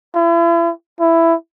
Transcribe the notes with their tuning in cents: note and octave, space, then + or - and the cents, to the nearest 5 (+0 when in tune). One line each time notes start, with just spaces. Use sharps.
E4 +40
E4 +10